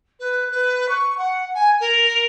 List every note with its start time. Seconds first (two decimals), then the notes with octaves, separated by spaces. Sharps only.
0.20 B4
0.51 B4
0.88 C#6
1.17 F#5
1.54 G#5
1.80 A#4